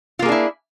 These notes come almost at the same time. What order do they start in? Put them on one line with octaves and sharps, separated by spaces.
F4 A#3 G#4 D4 E4